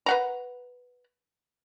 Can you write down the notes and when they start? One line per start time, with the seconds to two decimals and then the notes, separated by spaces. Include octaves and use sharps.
0.06 B4 F#5 A#5